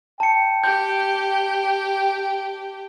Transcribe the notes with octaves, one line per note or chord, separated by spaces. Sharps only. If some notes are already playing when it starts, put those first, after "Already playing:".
G5 A5 C#7
G4 G6